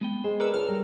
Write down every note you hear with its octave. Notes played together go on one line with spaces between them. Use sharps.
G#3 B3 G5
G#3 G#4 C5
A#4 B4 C#5 D5 E6
C#2 D4 A4 F6
G3 A#4